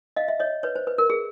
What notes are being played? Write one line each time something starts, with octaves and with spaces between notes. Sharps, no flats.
D#5 F5
E5
C#5 D#5
B4 C#5
C5
B4
A#4
G#4